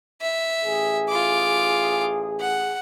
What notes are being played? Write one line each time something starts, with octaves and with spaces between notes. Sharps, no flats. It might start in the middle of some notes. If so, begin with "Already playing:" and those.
E5
A1 G#4
F4 D6
F#5